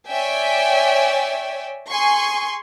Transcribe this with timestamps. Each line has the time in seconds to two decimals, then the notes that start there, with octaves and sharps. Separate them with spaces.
0.10 C#5 D5 E5 G5 G#5
1.88 G#4 G#5 C6 C#6